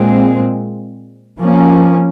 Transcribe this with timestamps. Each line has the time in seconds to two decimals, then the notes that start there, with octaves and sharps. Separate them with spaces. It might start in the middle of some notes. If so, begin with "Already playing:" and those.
Already playing: A#2 G#3 C4
1.40 F3 A#3 C#4